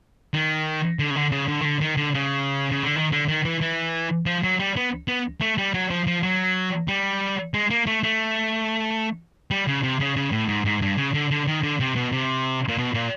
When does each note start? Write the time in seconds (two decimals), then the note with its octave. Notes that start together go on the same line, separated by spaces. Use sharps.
0.34 D#3
0.99 D3
1.10 C#3
1.16 D3
1.32 C#3
1.48 D3
1.61 D#3
1.65 D3
1.81 D#3
1.97 D3
2.14 C#3
2.71 C#3
2.84 D3
2.96 D#3
3.12 D3
3.29 D#3
3.45 E3
3.61 E3
4.26 F3
4.44 F#3
4.60 G3
4.76 B3
5.08 B3
5.41 A3
5.58 G3
5.74 F#3
5.90 F3
6.07 F3
6.23 F#3
6.88 G3
7.54 G#3
7.70 A#3
7.87 A3
8.03 A3
9.51 G3
9.67 C#3
9.83 C3
10.00 C#3
10.16 C#3
10.32 A2
10.48 G#2
10.65 G#2
10.81 G2
10.97 C#3
11.14 D3
11.31 D3
11.47 D#3
11.63 D3
11.80 C3
11.96 B2
12.12 C3
12.68 A#2
12.78 B2
12.94 A#2